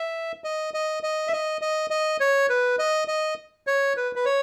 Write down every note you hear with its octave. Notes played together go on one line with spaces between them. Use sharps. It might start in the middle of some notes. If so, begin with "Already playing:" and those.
Already playing: E5
D#5
D#5
D#5
E5
D#5
D#5
D#5
C#5
B4
D#5
D#5
C#5
B4
B4
C#5